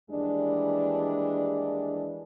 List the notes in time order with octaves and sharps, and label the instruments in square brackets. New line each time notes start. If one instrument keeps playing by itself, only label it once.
[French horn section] D#2 E3 G3 G#3 D4